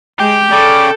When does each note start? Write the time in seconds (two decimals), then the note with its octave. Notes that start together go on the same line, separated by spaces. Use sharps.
0.19 G#3 G4 G5
0.52 C#3 A4 D5